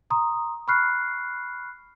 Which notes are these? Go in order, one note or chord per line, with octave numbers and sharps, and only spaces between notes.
A#5 C6 D#6
B5 C#6 F6 F#6 C7